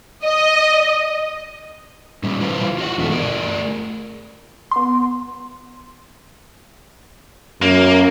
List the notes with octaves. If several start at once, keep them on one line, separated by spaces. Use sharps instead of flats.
D#5
A#2 G3
E4 F4 B4 C5 F5
F4 F#4 D5 F#5
E2 B2 A3
A3 G#4 A#4 D5
B3 C6
F#2 A#3